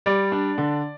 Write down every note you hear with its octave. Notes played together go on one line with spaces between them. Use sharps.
G3 D5
D4
D3